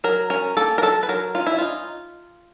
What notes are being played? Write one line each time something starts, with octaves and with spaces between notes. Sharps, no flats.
F#3 A#4
C#4 A#4
A#3 A4
A#4
F#3 A4
B4
F#3 A#4
C#4 F4
E4
D#4 F4